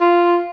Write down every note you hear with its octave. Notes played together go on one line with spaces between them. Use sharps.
F4